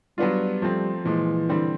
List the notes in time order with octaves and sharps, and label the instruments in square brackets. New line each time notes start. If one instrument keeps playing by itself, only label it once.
[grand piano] F#3 B3 D4 F4 [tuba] G3
[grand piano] F3 A3 C4
[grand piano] A#2 F3 G#3 [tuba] E3
[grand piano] D3 G3 C4